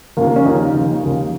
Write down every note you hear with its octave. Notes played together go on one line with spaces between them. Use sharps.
D#2 C#3 F3 A#3
A#3
C#4
D#2 C#3 F3 D#4
D#2 C#3 F3
D#2 C#3 F3